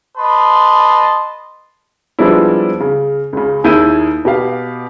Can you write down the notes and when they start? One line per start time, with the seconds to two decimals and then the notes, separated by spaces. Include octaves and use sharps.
0.18 B4 D#5 A5 C6
2.19 F3 G3 G#3 B3 D4 E4
2.80 C#3
3.33 C#2 C#3
3.64 D#2 A#3 E4 G#4 G6 D#7
4.25 B2 G4 F5